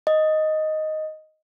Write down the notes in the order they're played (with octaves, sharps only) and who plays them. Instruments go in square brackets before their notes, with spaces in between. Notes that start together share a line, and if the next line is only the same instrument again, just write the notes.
[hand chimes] D#5